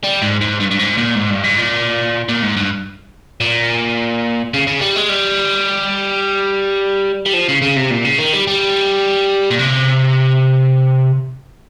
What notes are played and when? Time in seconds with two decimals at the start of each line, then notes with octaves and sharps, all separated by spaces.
0.04 G3
0.22 G#2
0.41 G#2
0.60 G2
0.71 G2
0.79 G#2
0.97 A#2
1.15 G#2
1.30 G2
1.44 G#2
1.58 A#2
2.28 A#2
2.43 G#2
2.57 G2
3.40 A#2
4.54 C#3
4.67 C#3
4.81 G3
4.96 G#3
5.09 G3
7.26 G3
7.34 F3
7.49 C#3
7.62 C#3
7.77 C3
7.91 A#2
8.04 C#3
8.18 D#3
8.33 G3
8.47 G3
9.51 A#2
9.59 C3